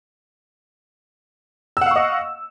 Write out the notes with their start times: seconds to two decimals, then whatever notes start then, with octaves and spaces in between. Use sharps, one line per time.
1.77 E6
1.81 F#5
1.86 F5
1.91 C#6
1.96 D#5